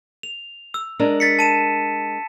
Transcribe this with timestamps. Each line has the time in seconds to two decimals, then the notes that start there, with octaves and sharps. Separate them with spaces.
0.23 F7
0.74 E6
0.99 G#3 D4 A#4
1.20 A6 B6 C#7
1.39 A5 D#7 E7